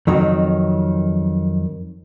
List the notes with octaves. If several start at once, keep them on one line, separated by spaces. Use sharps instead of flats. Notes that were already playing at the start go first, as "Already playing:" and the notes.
F2 D#3 F#3